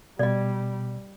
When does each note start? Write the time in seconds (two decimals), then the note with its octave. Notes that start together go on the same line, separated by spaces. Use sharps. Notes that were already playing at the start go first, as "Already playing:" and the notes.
0.19 B2 G3 D5 D#5